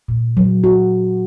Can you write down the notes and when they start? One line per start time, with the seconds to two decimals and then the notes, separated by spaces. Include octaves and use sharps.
0.08 A#2
0.37 F#3
0.64 F#4